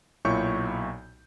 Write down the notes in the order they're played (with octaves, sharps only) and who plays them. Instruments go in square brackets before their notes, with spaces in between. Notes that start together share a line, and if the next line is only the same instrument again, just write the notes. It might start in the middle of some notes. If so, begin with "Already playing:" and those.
[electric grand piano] B1 A#2 E4 C#5 C#6 G6